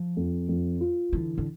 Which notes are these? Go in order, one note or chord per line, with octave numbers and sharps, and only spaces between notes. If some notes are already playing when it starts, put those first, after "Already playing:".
Already playing: F3
F2
F2
F4
D3 E3
D3